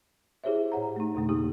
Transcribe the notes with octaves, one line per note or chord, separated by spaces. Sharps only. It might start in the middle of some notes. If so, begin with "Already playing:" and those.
E4 G4 G#4 C5 C#5 E5
A2 C#5 F#5 A#5
A3 D#4
F2 B2 D3 A3
A#3 D#4 G4 D#6